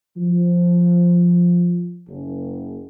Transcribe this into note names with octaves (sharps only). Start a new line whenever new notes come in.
F3
F#1